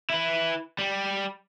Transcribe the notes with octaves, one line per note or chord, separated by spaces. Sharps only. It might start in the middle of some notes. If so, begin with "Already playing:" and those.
E4 B4
G3